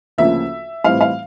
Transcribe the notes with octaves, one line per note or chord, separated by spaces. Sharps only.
D2 C#3 F3 A#3 E5
A2 E3 G3 C4 E4 F5
F5